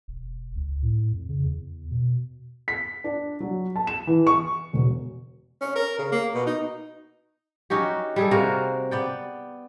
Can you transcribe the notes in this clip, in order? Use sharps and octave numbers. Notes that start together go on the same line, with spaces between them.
E1
C#2
A2
F2
C#3
E2
B2
B6
D4
F#3
A5
E7
E3
C#6
E1
C#4
A#4
C#3
A#3
B2
D#4
C#4 D#4 F#4 G4
G3 G#4 A4
C3 A#3 F#4 A#4
B3 D5 G5